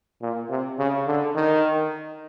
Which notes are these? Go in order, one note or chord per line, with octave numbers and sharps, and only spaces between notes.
A#2
C3
C#3
D3
D#3